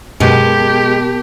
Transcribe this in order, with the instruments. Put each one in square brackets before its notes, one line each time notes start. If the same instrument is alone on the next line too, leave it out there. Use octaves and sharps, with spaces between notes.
[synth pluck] F#2 B2 [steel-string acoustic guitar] G#3 [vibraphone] B3 A#4 A5 [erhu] G4